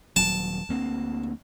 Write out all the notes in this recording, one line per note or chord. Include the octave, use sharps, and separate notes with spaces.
D#1 F#3 A5
D2 A#3 C4